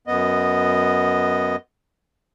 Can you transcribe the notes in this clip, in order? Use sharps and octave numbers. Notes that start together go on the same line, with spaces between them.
F#2 B3 D#5